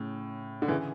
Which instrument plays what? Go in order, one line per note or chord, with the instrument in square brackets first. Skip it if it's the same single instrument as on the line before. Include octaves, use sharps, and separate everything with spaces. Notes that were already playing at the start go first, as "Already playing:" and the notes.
Already playing: [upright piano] A2 C#3
D3
C#3 E3